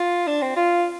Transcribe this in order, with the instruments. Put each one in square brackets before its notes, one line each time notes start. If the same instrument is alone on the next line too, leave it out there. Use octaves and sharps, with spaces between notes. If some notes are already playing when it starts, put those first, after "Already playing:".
Already playing: [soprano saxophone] F4
D4
C4
F4